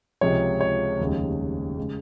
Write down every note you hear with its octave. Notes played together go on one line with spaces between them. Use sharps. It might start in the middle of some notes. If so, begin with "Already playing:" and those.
C#2 C3 F3 G#3 C#5
C#5
F1 D#2 C#3 G#3
C#3 G#3